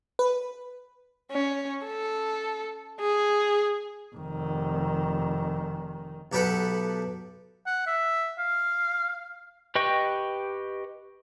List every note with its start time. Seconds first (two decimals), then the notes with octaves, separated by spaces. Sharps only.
0.19 B4
1.32 C#4
1.86 A4
3.00 G#4
4.15 F1 D#3
6.32 B1 G4 A4 B4 F#5
7.66 F#5
7.87 E5
8.39 F5
9.75 G4 B4 D#5 G5 C#6